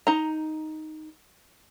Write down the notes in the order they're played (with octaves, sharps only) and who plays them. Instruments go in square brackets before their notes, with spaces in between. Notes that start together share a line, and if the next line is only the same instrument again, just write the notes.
[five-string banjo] D#4 A#5